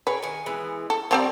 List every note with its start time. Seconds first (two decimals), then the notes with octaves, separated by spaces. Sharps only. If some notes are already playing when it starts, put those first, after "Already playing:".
0.07 G#4 A#4 B4 C#5
0.22 D#3 F#5 G#5
0.46 E3 G#3 B3
0.90 A4
1.11 F3 G3 C4 D5 G5 A#5